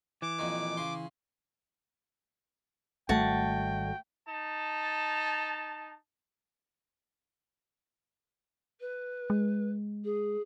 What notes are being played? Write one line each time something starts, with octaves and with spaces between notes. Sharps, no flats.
E3 D6
F2 A#2 D#3
C#3 C6
G#1 G3 A3 F#4 G5 A5
D#4 A5
B4
G#3
G#4